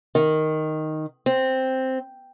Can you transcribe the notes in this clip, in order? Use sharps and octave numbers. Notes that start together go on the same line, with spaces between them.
D#3
C4